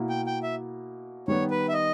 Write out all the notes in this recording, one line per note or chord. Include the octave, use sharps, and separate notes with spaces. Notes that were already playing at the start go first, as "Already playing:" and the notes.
Already playing: B2 A#3 E4
G5
G5
E5
D#3 G3 B3 C#5
B4
E5
D#5